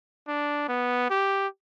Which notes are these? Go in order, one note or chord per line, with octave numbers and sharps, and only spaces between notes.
D4
B3
G4